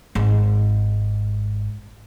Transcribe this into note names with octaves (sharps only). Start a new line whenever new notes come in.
G#1 G#2